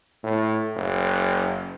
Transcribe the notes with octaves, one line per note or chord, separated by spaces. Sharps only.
A2
F#1